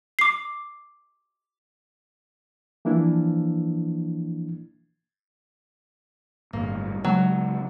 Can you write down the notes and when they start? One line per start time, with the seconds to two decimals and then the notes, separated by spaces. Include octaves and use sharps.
0.19 D6 C7
2.85 E3 F3 A#3 D4 E4
6.53 G1 A2 G3 A#3
7.05 C#3 F#3 G#3 B3